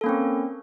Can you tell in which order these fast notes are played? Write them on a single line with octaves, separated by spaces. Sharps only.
A4 A#3 C#4 C4